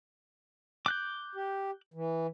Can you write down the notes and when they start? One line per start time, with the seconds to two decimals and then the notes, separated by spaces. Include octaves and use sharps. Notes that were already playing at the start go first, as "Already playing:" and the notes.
0.86 D6 F#6 G6
1.35 G4
1.94 E3